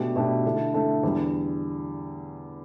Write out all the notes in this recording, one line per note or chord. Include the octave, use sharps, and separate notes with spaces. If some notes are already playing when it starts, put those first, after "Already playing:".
Already playing: B2 A3 D4 G4
B2 A3 D4 G4
D3 A3 E4 A4
D3 A3 E4 A4
E2 D3 G3